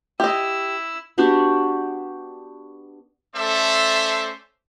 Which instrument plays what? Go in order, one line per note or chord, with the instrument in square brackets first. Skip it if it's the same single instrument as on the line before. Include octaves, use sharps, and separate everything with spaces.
[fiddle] E4 E6 [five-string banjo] G4 D#5
[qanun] B3 D4 F#4 G4
[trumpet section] A3 C#4 A4 C5 D5 E5